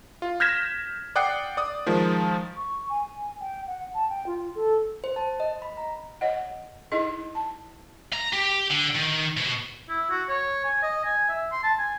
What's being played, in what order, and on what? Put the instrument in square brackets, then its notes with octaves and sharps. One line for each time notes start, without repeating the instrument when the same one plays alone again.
[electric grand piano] F4
F6 G6 G#6 A#6 B6 E7
D5 F#5 G5 D#6 F#6 C7
D5 D#6
D#3 F3 G#3
[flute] C#6
G#5
G#5
G5
F#5
A5
G5
F4
A4
[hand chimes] C5
A5
D#5
B5
A#5
[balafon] C#5 D#5 F#5
D#4 E4 G#4 D#5 C6
A5
[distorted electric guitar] A#5
G4
D3
D#3
B2
[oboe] E4
F#4
C#5
G#5
D#5
G#5
E5
C6
A5
G#5